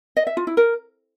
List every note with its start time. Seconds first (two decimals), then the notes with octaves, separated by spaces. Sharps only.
0.17 D#5
0.27 E5
0.37 F4
0.47 E4
0.57 A#4